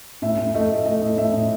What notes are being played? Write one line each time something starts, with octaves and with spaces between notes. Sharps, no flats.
A2 E5
A2
A3 D#5
A3
A3 D#5
A2
A2 E5
A2